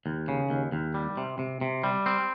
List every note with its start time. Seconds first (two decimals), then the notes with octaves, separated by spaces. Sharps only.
0.06 D#2
0.28 C#3
0.50 D#2
0.72 D#2
0.94 G3
1.17 C3
1.39 C3
1.61 C3
1.84 G3
2.06 C4